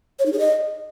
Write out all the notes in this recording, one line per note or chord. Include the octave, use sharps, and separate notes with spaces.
C#5
D#4
G#4
D#5